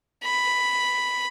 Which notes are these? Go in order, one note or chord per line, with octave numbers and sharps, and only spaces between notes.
B5